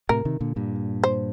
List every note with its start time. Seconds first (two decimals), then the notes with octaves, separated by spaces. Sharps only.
0.09 A2 C3 A#4
0.25 C3 D#3
0.41 A#2 D3
0.56 G2 A#2
1.04 C5